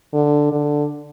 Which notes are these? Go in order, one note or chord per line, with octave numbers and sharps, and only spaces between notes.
D3
D3